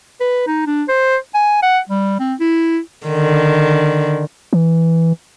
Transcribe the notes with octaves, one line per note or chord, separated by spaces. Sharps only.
B4
D#4
D4
C5
G#5
F#5
G3
C4
E4
D3 D#3
E3